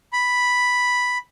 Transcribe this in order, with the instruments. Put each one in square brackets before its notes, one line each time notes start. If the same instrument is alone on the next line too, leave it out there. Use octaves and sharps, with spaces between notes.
[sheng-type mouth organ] B5